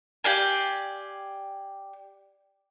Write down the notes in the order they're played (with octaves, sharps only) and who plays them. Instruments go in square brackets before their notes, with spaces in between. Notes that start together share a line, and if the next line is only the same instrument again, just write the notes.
[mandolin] G4 D5 F5 G#5